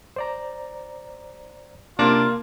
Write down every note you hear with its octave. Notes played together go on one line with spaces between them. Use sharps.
C5 D5 A#5
C3 A#3 D4 F4